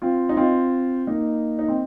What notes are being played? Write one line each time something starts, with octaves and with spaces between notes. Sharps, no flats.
C4 F4
D#4
C4 F4
A#3 D#4
D#4
C4